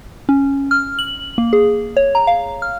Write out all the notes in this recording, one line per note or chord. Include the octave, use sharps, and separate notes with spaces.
C#4
F6
F#7
A#3
G#4
C#5
A#5
F5
F6